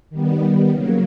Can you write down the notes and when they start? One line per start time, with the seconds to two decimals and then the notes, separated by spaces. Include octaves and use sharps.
0.10 D#3 G3 B3
0.70 C#3 F#3 A#3